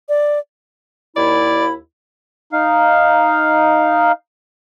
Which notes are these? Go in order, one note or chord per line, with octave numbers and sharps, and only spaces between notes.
D5
D#2 E4 D5 B5
D#4 F5